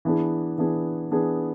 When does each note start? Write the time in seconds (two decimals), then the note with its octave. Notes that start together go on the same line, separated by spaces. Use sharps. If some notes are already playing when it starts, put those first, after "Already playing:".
0.05 E3 B3 D4 G#4
0.58 E3 B3 D4 G#4
1.11 E3 B3 D4 G#4